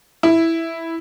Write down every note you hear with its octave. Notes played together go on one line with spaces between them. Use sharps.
E4